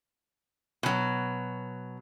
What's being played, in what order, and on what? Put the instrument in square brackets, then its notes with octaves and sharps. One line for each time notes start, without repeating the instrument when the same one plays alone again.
[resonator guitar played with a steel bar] B2 F#3